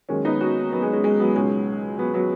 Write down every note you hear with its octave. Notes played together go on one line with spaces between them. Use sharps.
D#2 D#3 F#3 G#3 C#4
B3 D#4
C#4 F#4
F#3 B3
G#3
G#3 C#4
G#3 C#4
F#3 B3
C#2 B2 F#3 G#3 C#4
F#3 B3
F#3 B3